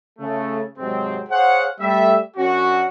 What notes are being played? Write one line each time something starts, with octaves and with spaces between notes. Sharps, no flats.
C#3 A3
G#2 C3 F#3 G#3 C4
G#4 C5 C#5 F5 F#5
G3 A3 E5
F#2 C#4 D4 F#4